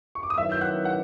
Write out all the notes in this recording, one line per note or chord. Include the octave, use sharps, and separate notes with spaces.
C#6
D6
D#6
D#3 F#3 B3 E4 E5 E6
G6
F#5 F#6
F#5 F#6